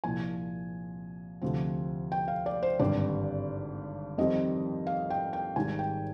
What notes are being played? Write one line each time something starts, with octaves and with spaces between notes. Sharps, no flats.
C2 A#2 F3 G#5
D2 C3 F3 C4
G5
F5
D5
C5
G#1 G2 D3 G3 C4 D5
F2 D#3 G3 C4 D#5
F5
G5
G5
G#1 G#2 D#3 G3 G#5
G5